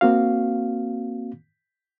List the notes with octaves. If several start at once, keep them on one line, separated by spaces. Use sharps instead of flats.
A#3 C4 F#4 F5